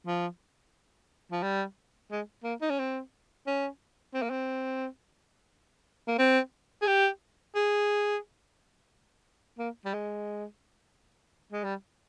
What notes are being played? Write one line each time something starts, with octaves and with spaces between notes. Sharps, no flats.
F3
F3
G3
G#3
A#3
D#4
C#4
C4
C#4
C4
A#3
C4
A#3
C4
G#4
G4
G#4
A#3
G3
G#3
G#3
G3